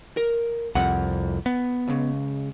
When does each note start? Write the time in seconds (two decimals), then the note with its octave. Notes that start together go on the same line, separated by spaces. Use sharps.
0.17 A#4
0.75 C2 F2 F#5
1.46 B3
1.88 C#2 C#3